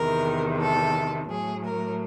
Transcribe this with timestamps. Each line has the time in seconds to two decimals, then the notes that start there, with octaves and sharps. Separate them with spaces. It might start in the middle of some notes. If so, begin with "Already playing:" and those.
Already playing: E2 C3 D#3 A#4
0.60 A4
1.30 A2 F#3 G#4
1.65 A#4